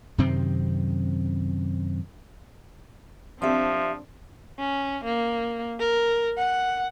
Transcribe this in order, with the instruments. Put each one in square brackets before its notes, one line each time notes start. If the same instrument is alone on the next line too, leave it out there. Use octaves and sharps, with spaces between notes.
[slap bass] F#2 C3 D#3 C4
[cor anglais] F3 [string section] C4 D4 [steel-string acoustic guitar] G4 E5
[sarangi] C#4
A#3
A#4
F#5